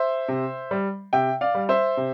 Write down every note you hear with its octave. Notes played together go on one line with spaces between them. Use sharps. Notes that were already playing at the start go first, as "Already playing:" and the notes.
Already playing: C5 E5
C3
G3
C3 E5 G5
D5 F5
G3
C5 E5
C3